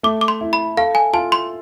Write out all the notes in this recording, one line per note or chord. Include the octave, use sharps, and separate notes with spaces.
A3 D6
D6
C6
E4
B5
A4 F5
G#5
F4 A5
C6